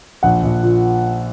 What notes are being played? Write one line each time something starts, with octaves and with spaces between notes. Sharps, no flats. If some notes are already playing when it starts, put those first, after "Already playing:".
A#1 F#5
A#1
A#2